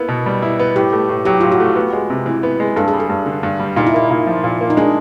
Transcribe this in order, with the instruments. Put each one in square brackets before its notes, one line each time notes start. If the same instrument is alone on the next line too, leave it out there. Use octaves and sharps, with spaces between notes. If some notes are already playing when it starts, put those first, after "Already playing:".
Already playing: [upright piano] A#3 B3 E4
B2
G3
E4
B3
[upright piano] A2 [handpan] G4
[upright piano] A3
A2
[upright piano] F#3 [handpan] G4
[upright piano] A2 [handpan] F4
[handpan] F#4
[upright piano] A3
B3
G#3
C3
E3
B3
G#3
[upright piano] G2 [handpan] A4
[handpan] G#4
[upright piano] G3
[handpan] A4
[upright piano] G2
D3
G2
G3
[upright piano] A#2 [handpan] D#4
[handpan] E4
[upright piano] A#3 [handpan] D#4
[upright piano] A#2
F3
A#2
A#3
[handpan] D#4
[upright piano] G#3 [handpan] D4